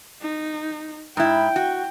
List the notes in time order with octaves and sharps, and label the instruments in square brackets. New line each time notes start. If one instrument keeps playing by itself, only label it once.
[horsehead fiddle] D#4
[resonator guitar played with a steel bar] G#2 E4 [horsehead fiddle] G5
[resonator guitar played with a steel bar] F#4